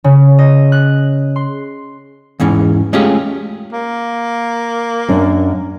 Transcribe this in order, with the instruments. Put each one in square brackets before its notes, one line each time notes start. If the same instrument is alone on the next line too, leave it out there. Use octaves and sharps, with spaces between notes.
[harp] C#3
D#5
F#6
C6
[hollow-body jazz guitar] E2 G#2 E3 C#4
G#3 A3 C#4 F4 G4 G#4
[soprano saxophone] A#3
[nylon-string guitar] F#2 D4